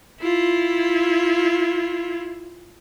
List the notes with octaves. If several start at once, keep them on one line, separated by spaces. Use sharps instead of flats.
E4 F4